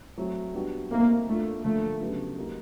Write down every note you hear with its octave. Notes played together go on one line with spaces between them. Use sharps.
F#3 A3 C4
G3 B3 D4 F#4
A3 A#3 C4 D#4
A3 A#3 D4 F4
D3 F3 A3 A#3 D4
C#3 F#3 B3 D4 G4
F#3 A#3 D#4 G4 A#4